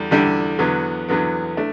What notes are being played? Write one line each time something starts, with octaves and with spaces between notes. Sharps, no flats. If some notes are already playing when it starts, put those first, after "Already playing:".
Already playing: E2 D3 G3
E2 D3 G3 D4
E2 D3 F#3 B3
E2 D3 F#3 B3
A3 D4